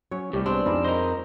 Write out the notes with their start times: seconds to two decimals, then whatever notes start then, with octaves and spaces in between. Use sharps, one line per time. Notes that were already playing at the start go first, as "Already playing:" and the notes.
0.11 F#3 C#4 C#5
0.33 C2 A2 G3 G4
0.46 B2 G#3 C4 D4
0.66 F2 G3 D#4 G#4
0.84 A#4 C5 D#5